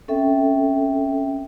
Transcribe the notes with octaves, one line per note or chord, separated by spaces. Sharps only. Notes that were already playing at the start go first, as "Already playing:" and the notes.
C4 C#4 A4 E5 G5